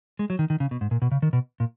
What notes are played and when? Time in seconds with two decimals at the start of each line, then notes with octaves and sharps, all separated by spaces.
0.19 G#3
0.30 F#3
0.39 D#3
0.50 D#3
0.60 C#3
0.71 B2
0.81 G#2
0.91 A#2
1.02 B2
1.12 C#3
1.22 D#3
1.33 B2
1.60 A#2